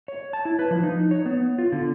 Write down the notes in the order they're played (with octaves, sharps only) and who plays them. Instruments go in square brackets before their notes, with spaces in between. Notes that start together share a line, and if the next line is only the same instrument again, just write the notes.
[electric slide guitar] C#5
A5
E4
B4
F3
D#4
C#5
B3
F4
D3